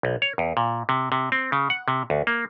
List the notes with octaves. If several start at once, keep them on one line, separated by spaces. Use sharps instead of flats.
B1
C#5
E2
A#2
C3
C3
C4
C#3
F#5
C3
D2
A#3